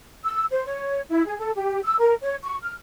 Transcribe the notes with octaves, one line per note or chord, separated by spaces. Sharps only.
E6
C5
C#5
E4
G#4
A4
G4
E6
A#4
C#5
C#6
F6